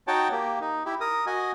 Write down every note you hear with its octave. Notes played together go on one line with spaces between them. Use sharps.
D#4 F#4 C#5 G5 A5
A#3 G4
D#4
E4 G4
A#4 D#6
F#4 D#5 G#5